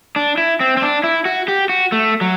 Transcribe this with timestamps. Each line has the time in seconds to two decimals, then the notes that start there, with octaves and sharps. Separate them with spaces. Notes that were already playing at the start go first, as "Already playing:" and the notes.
0.16 D4
0.38 E4
0.60 C4
0.77 C4
0.82 D4
1.04 E4
1.25 F#4
1.48 G4
1.69 F#4
1.92 A3
2.21 F#3